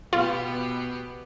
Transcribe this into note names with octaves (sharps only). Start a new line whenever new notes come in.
B2 B3 F4 G4